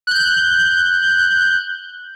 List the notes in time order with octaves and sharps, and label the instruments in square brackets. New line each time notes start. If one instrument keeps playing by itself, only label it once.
[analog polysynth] F#6 G6